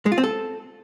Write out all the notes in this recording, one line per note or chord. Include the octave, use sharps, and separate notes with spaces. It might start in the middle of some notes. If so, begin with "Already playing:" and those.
G#3
F4
C4
A4